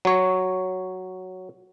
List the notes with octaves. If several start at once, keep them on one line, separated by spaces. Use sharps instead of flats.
F#3 C#5